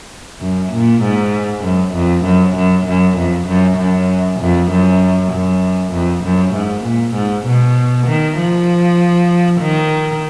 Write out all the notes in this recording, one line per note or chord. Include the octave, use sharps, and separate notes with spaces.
F#2
A#2
G#2
F#2
F2
F#2
F#2
F#2
F2
F#2
F#2
F2
F#2
F#2
F2
F#2
G#2
A#2
G#2
B2
D#3
F3
D#3